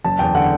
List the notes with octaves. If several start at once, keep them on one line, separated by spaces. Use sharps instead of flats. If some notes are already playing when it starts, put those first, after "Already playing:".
F#1 A5
E2 G5
D3 F#5